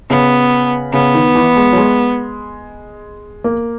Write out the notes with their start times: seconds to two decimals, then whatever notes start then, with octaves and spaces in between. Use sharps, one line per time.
0.10 C#3 B3
0.93 C#3 B3
1.15 D#3
1.35 E3
1.56 G#3
1.73 F#3
1.77 G#3
3.44 A#3